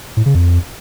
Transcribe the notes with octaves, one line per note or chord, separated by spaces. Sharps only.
A2
C#3
F2